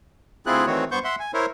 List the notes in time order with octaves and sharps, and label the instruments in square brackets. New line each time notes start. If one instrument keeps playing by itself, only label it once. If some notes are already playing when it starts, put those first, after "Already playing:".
[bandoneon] D2 C4 E4 F4 G#4 F#6
D#3 E3 A3 C4 F#4 C#5
G2 B3 C5 C#6 G6
E5 F#5 C6
G#5
E4 A#4 C5 C#5